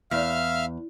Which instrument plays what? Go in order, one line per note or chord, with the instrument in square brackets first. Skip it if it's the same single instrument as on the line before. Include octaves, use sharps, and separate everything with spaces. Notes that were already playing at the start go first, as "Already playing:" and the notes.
[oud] E2 [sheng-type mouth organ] E5 F5 F6